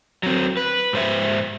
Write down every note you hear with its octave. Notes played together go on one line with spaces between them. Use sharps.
F#3 C4
B4
G#2 C5 E5